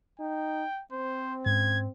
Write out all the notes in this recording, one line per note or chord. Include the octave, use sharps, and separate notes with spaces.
D#4 G5
C4 C5
G#2 C#4 G#6